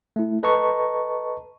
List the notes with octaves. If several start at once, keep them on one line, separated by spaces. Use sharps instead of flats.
A3 E4
A4 B4 D#5 A5 A#5 C#6